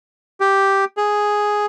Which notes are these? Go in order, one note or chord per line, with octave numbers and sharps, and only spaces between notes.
G4
G#4